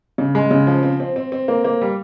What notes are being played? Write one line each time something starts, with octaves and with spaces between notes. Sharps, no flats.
C#3
G#3
C#3
F3
C4
C4
C4
C4
A#3
A#3
G3